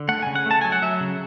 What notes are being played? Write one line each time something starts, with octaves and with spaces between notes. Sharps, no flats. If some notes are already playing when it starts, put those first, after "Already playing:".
Already playing: D3
A3 F#5
C#3 G#5
F#5
A3 A5
F#3 G#5
F#5
F#3 E5
C#3